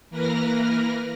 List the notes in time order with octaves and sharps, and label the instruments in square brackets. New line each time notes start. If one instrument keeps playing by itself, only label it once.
[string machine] E3 A#3 A#4 B4 F6 A#6